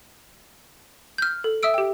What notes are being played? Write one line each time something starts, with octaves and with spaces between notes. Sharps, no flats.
F6 G6
A4
E5 D#6 E6 D7
G4 G5